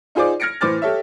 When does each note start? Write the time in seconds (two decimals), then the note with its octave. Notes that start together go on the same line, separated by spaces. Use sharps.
0.15 D#4 F4 G#4 C5 D5 D6
0.40 F6 G#6 A#6 C#7 D7
0.61 A2 E3 C5 D6 F6 A6
0.82 G4 A4 C#5 E5